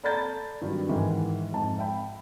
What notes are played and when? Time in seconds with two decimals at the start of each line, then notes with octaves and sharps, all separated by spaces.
0.04 A4 D5 A#5 B5 G6 A6
0.61 G2 D#3 F#3
0.89 G#2 D#3 E3 G#3
1.52 F2 G#2 A5
1.79 E5 G5 B5